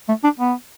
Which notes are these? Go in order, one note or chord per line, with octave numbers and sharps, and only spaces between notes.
A3
D4
B3